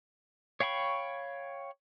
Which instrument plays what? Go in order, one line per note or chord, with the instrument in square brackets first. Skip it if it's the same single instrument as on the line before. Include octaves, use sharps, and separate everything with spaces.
[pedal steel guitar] C#5 F5 G5 B5 C#6